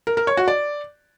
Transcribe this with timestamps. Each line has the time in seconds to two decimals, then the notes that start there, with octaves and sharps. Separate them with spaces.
0.07 A#4
0.17 A#4
0.27 C#5
0.37 F#4
0.48 D5